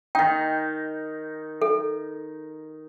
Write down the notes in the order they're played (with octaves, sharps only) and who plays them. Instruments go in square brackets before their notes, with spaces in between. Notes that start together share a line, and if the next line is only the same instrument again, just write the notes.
[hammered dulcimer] D#3 D#4 [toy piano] G5
[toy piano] A4